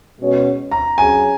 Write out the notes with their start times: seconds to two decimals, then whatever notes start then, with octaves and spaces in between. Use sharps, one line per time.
0.19 B2 G#3 C#4 F#4 C#5
0.71 A#5
0.98 F#3 C#4 G#4 G#5